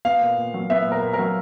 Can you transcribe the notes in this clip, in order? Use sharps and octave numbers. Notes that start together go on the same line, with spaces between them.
B3 F5
A#2
A#2
F#3
B3 E5
A#2
A#4
A#2
A#4
F#3